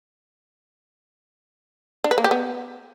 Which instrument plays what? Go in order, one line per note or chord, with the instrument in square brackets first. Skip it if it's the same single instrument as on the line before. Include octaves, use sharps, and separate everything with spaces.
[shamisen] D4
B4
A#3
G4
B3